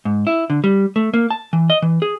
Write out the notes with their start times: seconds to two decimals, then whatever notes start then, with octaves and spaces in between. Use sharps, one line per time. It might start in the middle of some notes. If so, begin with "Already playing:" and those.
0.05 G#2
0.27 E4
0.50 D3
0.64 G3
0.96 A3
1.14 A#3
1.31 A5
1.53 E3
1.70 D#5
1.82 E3
2.02 G#4